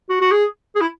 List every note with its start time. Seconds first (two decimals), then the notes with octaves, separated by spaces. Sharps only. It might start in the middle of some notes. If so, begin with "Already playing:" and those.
0.09 F#4
0.21 F#4
0.31 G#4
0.75 G#4
0.81 E4